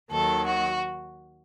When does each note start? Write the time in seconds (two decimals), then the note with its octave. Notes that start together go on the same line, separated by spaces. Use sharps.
0.10 D#2 D#3 F#3 A4
0.46 F#4